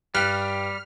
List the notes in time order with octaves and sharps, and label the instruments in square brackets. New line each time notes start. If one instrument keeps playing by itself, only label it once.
[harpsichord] G2 [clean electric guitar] G3 [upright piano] G5 F#6 B6 [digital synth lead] F6